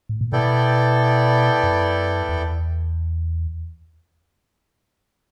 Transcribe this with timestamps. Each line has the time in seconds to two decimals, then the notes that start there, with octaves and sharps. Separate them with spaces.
0.09 A2
0.21 A#2
0.32 B2 B3 E4 A4 D5 G5
1.63 F#2
2.29 E2